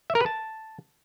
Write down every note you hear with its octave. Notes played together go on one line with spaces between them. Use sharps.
E5
A#4
B4
A5